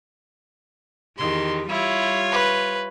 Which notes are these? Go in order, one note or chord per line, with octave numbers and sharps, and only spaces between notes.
E2 D#3 G4 C6
G3 E4 F4 C#5
B4